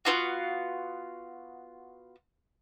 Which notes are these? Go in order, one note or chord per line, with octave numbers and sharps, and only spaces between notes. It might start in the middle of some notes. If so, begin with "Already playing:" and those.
B3 C#4 F4 F#4